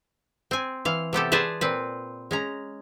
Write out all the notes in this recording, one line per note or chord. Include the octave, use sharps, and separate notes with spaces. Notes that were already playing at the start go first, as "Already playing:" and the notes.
C4 G#5
E3 F5
C3 B3 G4 A4
G#4 B4 C5 D5 A5
A#2 C4 B4
G#3 C#4 A#5